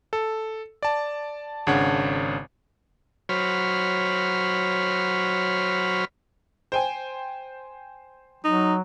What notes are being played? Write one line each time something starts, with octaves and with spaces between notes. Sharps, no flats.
A4
D5 A5
G#1 C#3 D4 C#5 F#5
F#3 C5 C#5 B5 F6
C5 G5 G#5
F#3 D#4